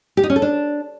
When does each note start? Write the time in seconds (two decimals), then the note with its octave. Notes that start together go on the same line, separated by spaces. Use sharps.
0.17 G4
0.23 D#4
0.30 C#4
0.36 A4
0.42 D4